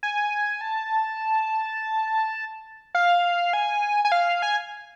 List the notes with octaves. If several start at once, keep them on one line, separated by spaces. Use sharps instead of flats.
G#5
A5
F5
G#5
G#5
F5
G#5